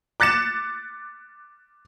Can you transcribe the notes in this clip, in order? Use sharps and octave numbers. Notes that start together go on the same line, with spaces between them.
D6 F#6 A6 C#7 E7